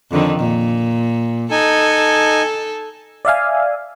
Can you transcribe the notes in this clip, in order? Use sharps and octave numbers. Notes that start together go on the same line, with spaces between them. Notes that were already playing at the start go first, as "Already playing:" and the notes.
F2 D3 D#3
A#2
D#4 A4 G#5
D5 E5 F5 G#5